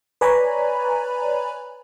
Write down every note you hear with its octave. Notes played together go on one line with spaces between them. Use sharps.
B4 C#5 D5 G#5 A#5 B5